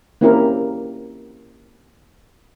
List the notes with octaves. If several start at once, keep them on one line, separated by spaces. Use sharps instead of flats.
A#3 C4 C#4 E4 G4 A#4